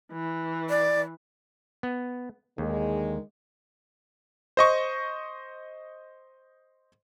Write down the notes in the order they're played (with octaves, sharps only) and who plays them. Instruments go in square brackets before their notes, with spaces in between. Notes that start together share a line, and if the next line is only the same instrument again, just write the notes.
[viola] E3
[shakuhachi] D5
[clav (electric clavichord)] B3
[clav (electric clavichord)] D#2 [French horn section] D3 D#3 G#3
[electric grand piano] C5 D#5 C#6